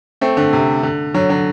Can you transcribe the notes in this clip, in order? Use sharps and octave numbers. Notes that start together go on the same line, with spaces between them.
A3 C4
D3
C3
D3
D3 F#3
D3 F#3